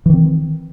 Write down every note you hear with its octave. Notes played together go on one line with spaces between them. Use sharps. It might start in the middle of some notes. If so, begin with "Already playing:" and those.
D#3 E3 C4